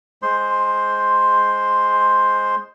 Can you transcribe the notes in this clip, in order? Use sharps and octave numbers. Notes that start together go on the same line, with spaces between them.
G#3 C5 C6